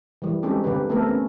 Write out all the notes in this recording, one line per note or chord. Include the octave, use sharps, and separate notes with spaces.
E3 G3
G#3 C4 C#4 D#4 G4 A4
D3 C4 G4 B4
A3 B3 C4 A4 A#4
C#4